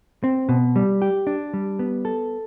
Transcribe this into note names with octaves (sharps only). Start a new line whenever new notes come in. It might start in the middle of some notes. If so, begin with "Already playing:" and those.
C4
B2
G3
G4
D4
G3
B3
A4